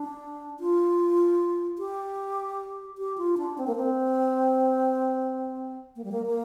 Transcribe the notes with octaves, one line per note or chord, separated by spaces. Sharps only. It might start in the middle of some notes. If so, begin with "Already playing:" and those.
Already playing: D4
F4
G4
G4
F4
D4
C4
A#3
C4
A#3
G3
A#3
A#3